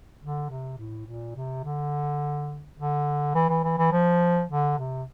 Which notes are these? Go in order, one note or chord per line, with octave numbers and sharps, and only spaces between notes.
D3
C3
A2
A#2
C3
D3
D3
E3
E3
E3
E3
F3
D3
C3